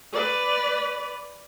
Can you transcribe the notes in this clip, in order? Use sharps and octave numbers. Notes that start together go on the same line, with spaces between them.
B4 D5